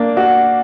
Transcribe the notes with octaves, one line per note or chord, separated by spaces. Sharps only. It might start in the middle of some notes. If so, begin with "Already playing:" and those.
Already playing: A#3 D4
F#4